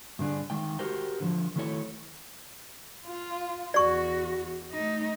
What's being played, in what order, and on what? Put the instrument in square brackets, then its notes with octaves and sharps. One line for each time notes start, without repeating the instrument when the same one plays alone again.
[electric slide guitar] G2 D3 D4 G#4
D#3 G#3 G5
F#4 G4 A#4 C5 G5
D3 D#3 F3
D#3 F#3 A3 E4 A4 C#5
[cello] F4
[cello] E2 F#4 [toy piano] D5 C#6
[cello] A3 D#4